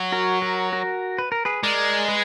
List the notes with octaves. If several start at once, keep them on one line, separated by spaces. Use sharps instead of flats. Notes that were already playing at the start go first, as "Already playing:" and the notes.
Already playing: F#3
F#4 A#4
F#4 A#4
F#4 A#4
B4
A#4
G#4 B4
G#3 A#4 D5
G#4 B4